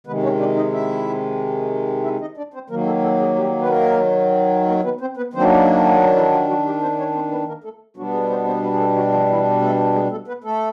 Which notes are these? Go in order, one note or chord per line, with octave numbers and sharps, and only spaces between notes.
C3 D#3 G#3 B3 B4
C#4 C#5
D4 D5
D#4 D#5
E4 E5
E4 E5
D#4 D#5
D4 D5
C4 C5
D#3 F#3 A#3 A#4
A3 A4
A3 A4
G#3 G#4
G3 G4
B4
A#3 A#4
A#3 A#4
B3 B4
C4 C5
B3 B4
D#3 F#3 A#3 C4 D4 C5
A#3 A#4
E3 E4
F3 F4
F#3 F#4
G3 G4
C4 C5
C#4 C#5
C4 C5
B3 B4
A#3 A#4
A3 A4
B2 F#3 G3 B3 D4 F#4
G#3 G#4
C4 C5
C4 C5
B3 B4
G#4
A3 A4
F#3 F#4
F3 F4
E3 E4
A3 A4
G#3 G#4
A3 A4
B3 B4
A3 A4